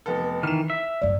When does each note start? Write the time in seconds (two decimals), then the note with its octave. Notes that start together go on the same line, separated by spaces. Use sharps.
0.06 F1 B3 A4
0.43 D#3 E3 F6 E7
0.70 E5
1.02 F#2 A2 D5